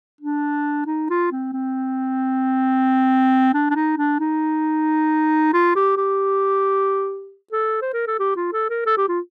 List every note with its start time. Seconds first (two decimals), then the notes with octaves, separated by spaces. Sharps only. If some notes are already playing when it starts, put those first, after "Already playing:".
0.21 D4
0.87 D#4
1.10 F4
1.32 C4
1.53 C4
3.54 D4
3.71 D4
3.75 D#4
3.98 D4
4.20 D#4
5.54 F4
5.76 G4
5.97 G4
7.53 A4
7.82 C5
7.93 A#4
8.07 A4
8.20 G4
8.36 F4
8.53 A4
8.70 A#4
8.86 A4
8.97 G4
9.08 F4